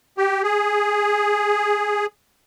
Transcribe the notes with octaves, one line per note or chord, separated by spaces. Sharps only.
G4
G#4